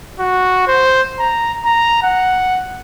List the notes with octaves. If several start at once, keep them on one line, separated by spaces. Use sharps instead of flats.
F#4
C5
A#5
A#5
F#5